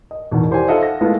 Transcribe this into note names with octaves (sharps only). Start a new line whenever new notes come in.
D#5
E2 B2 D#3
E4 G4 C5 D5 G#5
D#4 F4 A4 D#5 E5 F#5
A#6
G#3 A3 B3 E4 F4